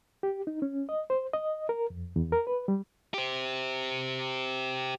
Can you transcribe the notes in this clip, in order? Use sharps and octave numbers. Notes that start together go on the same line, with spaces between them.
G4
D#4
C#4
D#5
C5
D#5
A#4
F2
E2
A#4
B4
G3
G4 C5